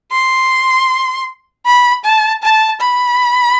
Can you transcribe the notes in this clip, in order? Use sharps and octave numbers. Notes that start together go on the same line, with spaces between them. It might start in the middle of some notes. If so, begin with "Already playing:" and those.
C6
B5
A5
A5
B5